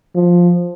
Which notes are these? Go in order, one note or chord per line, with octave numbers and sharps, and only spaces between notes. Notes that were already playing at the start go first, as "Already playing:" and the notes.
F3